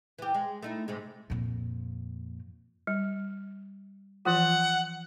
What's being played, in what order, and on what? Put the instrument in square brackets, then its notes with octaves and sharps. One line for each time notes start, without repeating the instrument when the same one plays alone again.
[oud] E3 G4
G#3
A3 D#4 E4
G#2 C3 G#3
[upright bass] F2 A#2
[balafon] G3
[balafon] E3 F3 F4 [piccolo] F#5